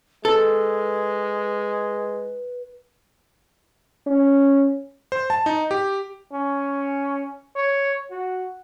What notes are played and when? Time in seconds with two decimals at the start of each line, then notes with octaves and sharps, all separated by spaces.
0.25 G#3 A4 B4
4.07 C#4
5.12 C5
5.30 A5
5.46 D#4
5.71 G4
6.33 C#4
7.56 C#5
8.11 F#4